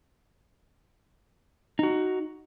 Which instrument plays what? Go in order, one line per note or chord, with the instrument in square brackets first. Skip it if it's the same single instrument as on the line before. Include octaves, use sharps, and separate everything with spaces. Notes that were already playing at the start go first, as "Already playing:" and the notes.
[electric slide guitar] D#4 F#4